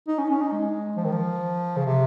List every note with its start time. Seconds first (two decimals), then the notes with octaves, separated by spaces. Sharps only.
0.08 D#4
0.19 C#4
0.31 C#4
0.41 D#4
0.52 G#3
0.97 F3
1.05 D#3
1.12 F3
1.77 C#3
1.86 C3